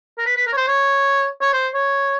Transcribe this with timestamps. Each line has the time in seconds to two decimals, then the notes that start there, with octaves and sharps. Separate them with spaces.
0.18 A#4
0.26 B4
0.37 B4
0.47 A#4
0.53 C#5
0.57 C5
0.68 C#5
1.41 C#5
1.53 C5
1.74 C#5